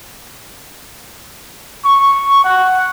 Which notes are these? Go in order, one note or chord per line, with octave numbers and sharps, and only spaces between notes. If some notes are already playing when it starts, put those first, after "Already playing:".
C#6
F#5